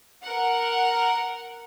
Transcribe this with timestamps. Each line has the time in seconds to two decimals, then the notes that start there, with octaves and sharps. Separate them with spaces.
0.22 A#4 F#5